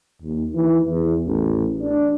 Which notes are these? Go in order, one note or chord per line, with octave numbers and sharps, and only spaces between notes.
D#2
E3
E2
A1
D4